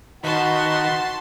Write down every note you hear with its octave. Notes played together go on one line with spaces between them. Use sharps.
D#3 F#4 B4 F#5 A5 C6